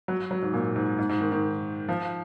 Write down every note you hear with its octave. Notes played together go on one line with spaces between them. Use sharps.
F#3
F#3
G#2
A#2
G#2
G#2
G#2
D#3
D#3
F3